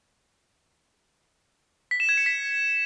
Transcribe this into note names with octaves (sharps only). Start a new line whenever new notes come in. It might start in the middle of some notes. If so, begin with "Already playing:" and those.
B6
E7
G#6
C#7
B6